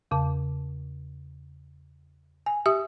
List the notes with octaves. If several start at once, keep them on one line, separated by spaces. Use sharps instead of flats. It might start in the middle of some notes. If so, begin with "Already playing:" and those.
E2 C#3 A5
G#5
G4 E5 D#6